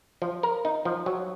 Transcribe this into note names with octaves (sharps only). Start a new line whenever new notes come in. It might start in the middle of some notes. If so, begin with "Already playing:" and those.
F3
A#4
D#4
F3
F#3